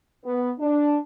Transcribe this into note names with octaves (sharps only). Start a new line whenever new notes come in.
B3
D4